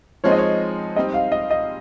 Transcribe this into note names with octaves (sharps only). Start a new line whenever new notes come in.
F3 G#3 C4 D#4 C#5
D#5
C#5
G3 C4 D#4 D#5
F5
D#5
D#5